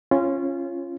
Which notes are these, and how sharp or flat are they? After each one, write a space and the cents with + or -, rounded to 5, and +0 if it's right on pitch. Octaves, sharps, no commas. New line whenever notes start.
C#4 -15 F4 -20